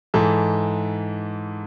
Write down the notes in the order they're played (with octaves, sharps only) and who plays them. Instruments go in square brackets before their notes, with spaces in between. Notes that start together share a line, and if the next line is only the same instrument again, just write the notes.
[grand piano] G#2 E3 A4